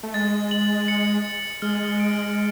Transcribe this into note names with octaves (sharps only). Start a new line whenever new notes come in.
A3
G#3 A6
F#7
C#7
A6
G#3 F6
D7